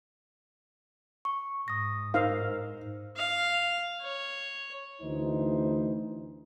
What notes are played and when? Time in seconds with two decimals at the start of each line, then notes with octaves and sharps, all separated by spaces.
1.25 C#6
1.68 G#2 D#6 A#6
2.14 D#4 A#4 C5 F5 E6
3.16 F5
4.02 C#5
5.02 D2 E3 D#4 C5